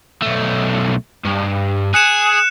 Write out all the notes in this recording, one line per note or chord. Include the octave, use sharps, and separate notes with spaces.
B1 A3
G2
G#4 F#6 C#7 E7